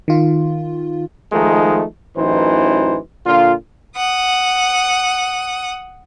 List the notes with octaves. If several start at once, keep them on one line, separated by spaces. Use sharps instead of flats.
D#3 F4
D#3 F3 G#3 A3 D#4
A1 F#2 E3 D#4 C5
A#2 D3 F4
F#5 D#6